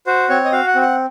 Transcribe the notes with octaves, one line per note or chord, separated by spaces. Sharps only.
F#4 C5
C4 C#5
D#5
F#4 F5
F#5
C4
F#5